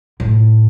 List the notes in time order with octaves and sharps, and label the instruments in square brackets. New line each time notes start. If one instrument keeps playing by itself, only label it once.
[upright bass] A2